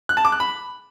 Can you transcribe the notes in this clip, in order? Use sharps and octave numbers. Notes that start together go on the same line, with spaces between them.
F#6
A5
D6
F#6
B5